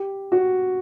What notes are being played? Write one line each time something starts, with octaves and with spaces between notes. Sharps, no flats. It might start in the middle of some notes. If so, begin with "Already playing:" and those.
Already playing: G4
F#4